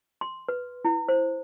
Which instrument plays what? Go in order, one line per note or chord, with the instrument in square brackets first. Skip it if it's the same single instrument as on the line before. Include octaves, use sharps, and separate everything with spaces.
[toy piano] C6
B4
E4
C5